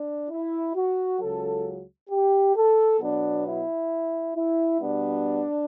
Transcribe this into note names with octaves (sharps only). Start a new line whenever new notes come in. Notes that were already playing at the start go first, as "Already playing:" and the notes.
Already playing: D4
E4
F#4
C#2 C#3 F#3 A4
G4
A4
B2 F#3 B3 D4
E4
E4
B2 G3 B3 D4